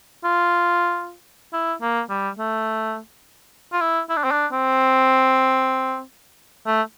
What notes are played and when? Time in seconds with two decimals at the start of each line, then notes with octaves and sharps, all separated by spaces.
0.24 F4
1.53 E4
1.82 A#3
2.09 G3
2.38 A3
3.73 F4
3.81 E4
4.10 E4
4.17 D4
4.24 C4
4.31 D4
4.52 C4
6.67 A3